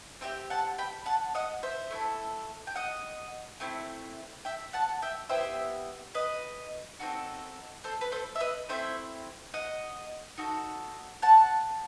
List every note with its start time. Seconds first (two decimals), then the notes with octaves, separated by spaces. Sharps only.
0.21 C4 D#4 G4 E5 G5
0.50 F#5 A5
0.78 G5 B5
1.06 F#5 A5
1.35 D#5 F#5
1.63 C5 E5
1.91 A3 E4 A4
2.67 G5
2.76 D#5 F#5
3.60 A3 C4 E4
4.45 E5 G5
4.73 F#5 A5
5.02 E5 G5
5.29 B3 E4 G4 C5 E5
6.15 B4 D#5
7.00 C4 D#4 F#4 A4
7.84 A4 C5
8.01 B4
8.12 A4 C5
8.35 E5
8.40 B4 D#5
8.69 A3 C4 E4 C5 E5
9.54 D#5 F#5
10.38 D#4 F#4 A4
11.22 F#5 A5